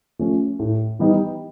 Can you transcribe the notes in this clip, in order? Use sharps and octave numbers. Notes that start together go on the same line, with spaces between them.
F3 A3 C#4
A2
E3 G3 B3 D#4